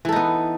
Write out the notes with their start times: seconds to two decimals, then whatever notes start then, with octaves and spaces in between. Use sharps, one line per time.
0.05 E3
0.09 A4
0.12 D#4
0.16 B3